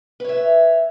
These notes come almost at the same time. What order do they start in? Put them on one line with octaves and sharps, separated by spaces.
B4 C#5 E5